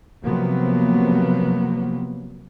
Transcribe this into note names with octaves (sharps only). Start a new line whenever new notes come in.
C3 F3 F#3 A#3 B3